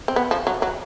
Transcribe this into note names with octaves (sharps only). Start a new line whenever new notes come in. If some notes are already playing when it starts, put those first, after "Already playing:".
C4
B3
F3
F#3
F#3